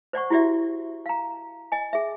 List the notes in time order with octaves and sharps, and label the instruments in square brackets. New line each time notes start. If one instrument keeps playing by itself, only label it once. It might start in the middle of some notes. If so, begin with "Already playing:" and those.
[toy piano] C5 D5 F#5 C#6
E4 F#4 G4 D5 E5
F5 A#5
D#5 G#5
G#4 E5